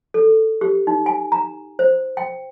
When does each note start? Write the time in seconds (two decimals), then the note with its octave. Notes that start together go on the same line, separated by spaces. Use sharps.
0.14 A4
0.61 G4
0.87 D#4
1.06 G#5
1.32 A#5
1.79 C5
2.17 G5